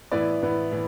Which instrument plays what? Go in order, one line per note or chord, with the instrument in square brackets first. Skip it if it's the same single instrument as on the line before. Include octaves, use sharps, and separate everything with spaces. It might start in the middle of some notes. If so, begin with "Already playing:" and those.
[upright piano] A2 E3 B3 E4 B4 D5
A2 E3 B3 E4
A2 E3